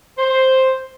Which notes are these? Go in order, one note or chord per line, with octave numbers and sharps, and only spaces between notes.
C5